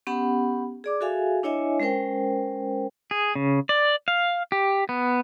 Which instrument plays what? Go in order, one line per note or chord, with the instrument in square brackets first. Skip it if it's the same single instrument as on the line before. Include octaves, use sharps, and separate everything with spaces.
[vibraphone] B3 C#4 G4 F#5 B5
G#4 D5 D6
F#4 G#4 A4 E5 F5 G#5
D4 E4 C#5 D#5 E5 G#5
G#3 C#4 A#4 C5 G5
[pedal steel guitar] G#4
C#3
D5
F5
G4
B3